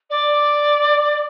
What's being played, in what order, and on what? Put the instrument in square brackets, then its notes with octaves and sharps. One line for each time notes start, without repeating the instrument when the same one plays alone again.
[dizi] D5